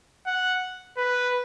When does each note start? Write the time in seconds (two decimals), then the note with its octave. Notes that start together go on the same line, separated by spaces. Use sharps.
0.26 F#5
0.97 B4